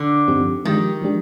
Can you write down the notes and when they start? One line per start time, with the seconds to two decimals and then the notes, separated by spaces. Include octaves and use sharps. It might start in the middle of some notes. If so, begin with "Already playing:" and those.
Already playing: D3
0.28 G2 F3 C4 D#4 G4
0.65 D#3 F3 G#3 D4 G4
1.02 F3 G#3 D4 G4